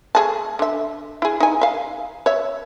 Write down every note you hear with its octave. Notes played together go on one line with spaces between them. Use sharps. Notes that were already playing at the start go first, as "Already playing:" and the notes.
A3 G#4 A5
D3 E5
E4 G#4
D#4 G#5
E5 F5
C#5 E5